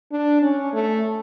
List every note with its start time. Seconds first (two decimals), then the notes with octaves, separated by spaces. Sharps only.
0.12 D4
0.42 C#4
0.73 A3